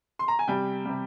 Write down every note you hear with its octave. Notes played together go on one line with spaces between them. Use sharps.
C6
A#5
G#5
C3 G3 G5
C3 G3